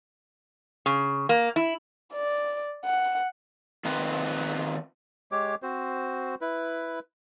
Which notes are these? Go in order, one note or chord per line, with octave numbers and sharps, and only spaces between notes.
C#3
A#3
E4
D5
F#5
D#3 C4 F4 B4
G#3 G4 C#5 D6
C4 F#4 C5
E4 B4